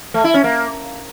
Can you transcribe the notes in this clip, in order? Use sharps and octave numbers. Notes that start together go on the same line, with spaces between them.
A3
E4
C#4
A#3